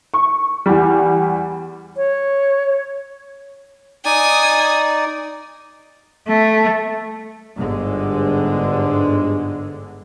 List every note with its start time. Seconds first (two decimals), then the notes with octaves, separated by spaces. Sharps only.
0.14 C#6
0.66 E2 G3
1.97 C#5
4.05 D#4 D5 G#5 D#6
6.28 A3
7.58 G1 G#2 D3 G#3